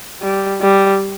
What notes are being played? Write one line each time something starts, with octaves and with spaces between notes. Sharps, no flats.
G3
G3